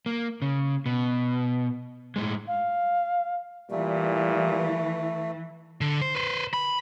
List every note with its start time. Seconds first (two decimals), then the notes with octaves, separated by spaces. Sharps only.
0.06 A#3
0.42 C#3
0.86 B2
2.16 A2 G#3
2.48 F5
3.71 A#2 E3 G3 A3
5.81 D3
6.01 C5
6.15 B4 C5
6.53 B5